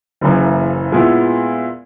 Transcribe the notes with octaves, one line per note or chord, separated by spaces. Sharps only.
F#1 F#2 C#3 E3 A#3
A#2 G#3 B3 E4